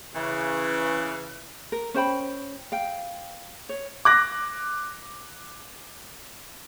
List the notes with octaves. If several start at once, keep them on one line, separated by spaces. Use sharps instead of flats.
C#3 E3
A#4
C#4 C5 G5 B5
F5 G5
C#5
D6 F#6 A#6